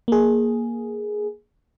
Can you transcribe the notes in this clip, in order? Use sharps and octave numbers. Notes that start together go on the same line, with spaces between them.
A#3 G#4